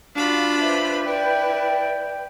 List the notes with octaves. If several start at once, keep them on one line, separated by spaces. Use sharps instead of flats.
D4 F4 F#4 F5 B5
G4 B4 C5 E5
E4 D5 G5